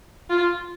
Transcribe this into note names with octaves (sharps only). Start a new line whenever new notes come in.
F4